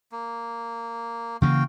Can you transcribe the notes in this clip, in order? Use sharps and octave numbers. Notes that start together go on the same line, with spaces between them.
A#3
C#3 E3 A#3 F#4 F5 G5